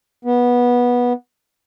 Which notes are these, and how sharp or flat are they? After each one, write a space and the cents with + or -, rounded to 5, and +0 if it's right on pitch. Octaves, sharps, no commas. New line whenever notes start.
B3 -15